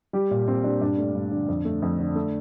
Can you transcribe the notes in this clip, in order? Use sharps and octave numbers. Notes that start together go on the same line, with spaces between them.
G3 G4
A#2
A#2 C4
G3 D4
G2 D4
A3
G2
D3
F2
A3
F2
D3
A3